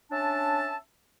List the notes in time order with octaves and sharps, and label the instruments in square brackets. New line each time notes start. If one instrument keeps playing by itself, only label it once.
[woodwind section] C#4 D4 E5 A5